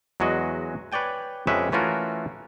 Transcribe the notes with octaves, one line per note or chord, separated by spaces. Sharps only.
E2 F#3 G#3 F#4 D#5
B4 C#5 D5 G5 G#5
F2 G#3 C#4 G4 B4 E5
E3 A3 C#4 F4 F#4 A#4